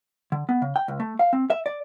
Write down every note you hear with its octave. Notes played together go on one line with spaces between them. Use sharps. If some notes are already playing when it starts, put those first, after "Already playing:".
D3
B3
C#3
G5
C#2
A3
F5
C4
E5
D5